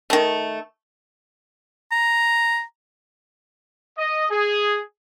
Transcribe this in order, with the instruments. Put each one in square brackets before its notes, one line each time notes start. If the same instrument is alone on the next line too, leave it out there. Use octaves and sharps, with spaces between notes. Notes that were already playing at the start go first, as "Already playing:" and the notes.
[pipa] D#3 A3
[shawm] A#5
[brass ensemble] D#5
G#4